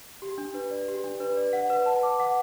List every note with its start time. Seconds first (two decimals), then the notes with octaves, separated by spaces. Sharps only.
0.22 G4
0.38 D4
0.54 B4
0.71 D5
0.88 G4
1.04 D4
1.20 B4
1.37 D5
1.53 F#5
1.70 B4
1.86 A5
2.03 D6
2.20 F#5